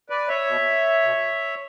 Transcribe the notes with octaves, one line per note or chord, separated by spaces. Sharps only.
B4 D5
C#5 E5
B2
B2